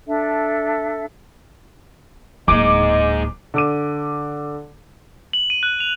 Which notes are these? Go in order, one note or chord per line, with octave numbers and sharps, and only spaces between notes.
D4 A4 E5
D1 G#3 A#3 D#4 D#5 D6
D3 D6 D#7
F#7
D#7
F#6
F7